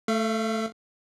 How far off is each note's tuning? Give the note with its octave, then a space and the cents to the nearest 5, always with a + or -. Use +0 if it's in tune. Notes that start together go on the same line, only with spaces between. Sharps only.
A3 +0 F5 -45